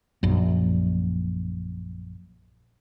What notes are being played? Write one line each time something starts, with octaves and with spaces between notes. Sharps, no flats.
A#1 F#2